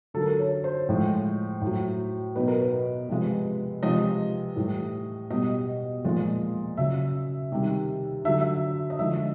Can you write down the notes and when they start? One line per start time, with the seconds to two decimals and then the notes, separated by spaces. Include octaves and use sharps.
0.14 D3 F#3 A4
0.21 A#4
0.29 A4
0.39 C#5
0.64 C5
0.89 A2 F3 G#3
1.61 A2
1.67 F#3
2.36 B2 F#3 B4
2.48 A#4
2.61 B4
3.09 C3 F3 G#3
3.83 C3 F3 G#3 D#5
4.56 A2 E3 G3
5.30 B2 G3 D#5
6.04 A#2 F3 G#3
6.77 C#3 F#3 E5
7.52 C3 D#3 G3
8.25 D3 F#3 E5
8.41 E5
8.90 D#5
8.99 D3 F3 G#3 E5